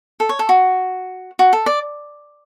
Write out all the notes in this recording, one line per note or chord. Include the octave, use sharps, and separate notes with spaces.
A4
C#5
A4
F#4
F#4
A4
D5